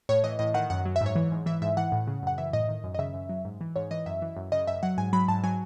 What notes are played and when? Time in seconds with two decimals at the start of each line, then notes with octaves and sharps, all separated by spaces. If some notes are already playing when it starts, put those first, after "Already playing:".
0.09 A2 C#5
0.24 E3 D#5
0.39 A2 D#5
0.54 D#3 F#5
0.70 F#2 F#5
0.85 F#3
0.96 E5
1.01 G#2
1.06 C#5
1.16 E3
1.32 G#2
1.46 E3 E5
1.62 G#2 E5
1.77 E3 F#5
1.92 A2
2.07 C#3
2.23 F#2 F#5
2.38 E3 E5
2.53 A2 D#5
2.69 D#3
2.84 F#2
2.94 D#5
2.99 C#3 E5
3.14 F#2
3.29 F#3
3.45 G#2
3.61 E3
3.76 G#2 C#5
3.91 E3 D#5
4.06 F#2 E5
4.22 E3
4.37 F#2
4.52 C#3 D#5
4.67 F#2 E5
4.83 F#3 F#5
4.98 G#2 G#5
5.13 F#3 B5
5.28 G#2 A5
5.44 F#3 G#5